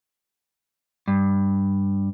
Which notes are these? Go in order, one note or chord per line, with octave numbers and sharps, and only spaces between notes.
G2